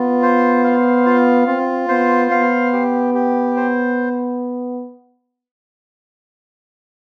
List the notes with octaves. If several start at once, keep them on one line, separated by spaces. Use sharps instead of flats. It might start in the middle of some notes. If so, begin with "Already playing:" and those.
Already playing: B3 F4
C5
F5
F4
C4 F4
B3 C5
B3 F5
G4
G4
C5